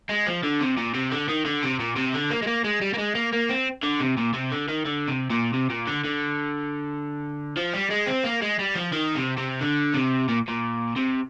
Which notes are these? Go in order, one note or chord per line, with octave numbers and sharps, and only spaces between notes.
G#3
F3
D3
C3
A#2
C3
D3
D#3
D3
C3
A#2
C3
D3
A#3
G#3
A#3
G#3
G3
A#3
G#3
A#3
A#3
C4
D3
C3
A#2
C3
D3
D#3
D3
C3
A#2
C3
A#2
D3
D3
F3
G3
G#3
C4
A#3
G#3
G3
F3
D#3
C3
C3
D3
C3
A#2
A#2
C3